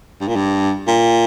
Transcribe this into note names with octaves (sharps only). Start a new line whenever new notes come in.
G2
A#2
G2
A#2